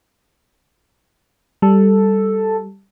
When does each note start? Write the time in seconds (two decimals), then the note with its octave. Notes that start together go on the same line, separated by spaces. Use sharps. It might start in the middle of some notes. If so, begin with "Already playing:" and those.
1.62 G3 A4